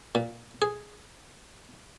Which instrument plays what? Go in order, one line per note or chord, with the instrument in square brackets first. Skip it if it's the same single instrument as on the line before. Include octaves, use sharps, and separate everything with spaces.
[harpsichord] A#2
G#4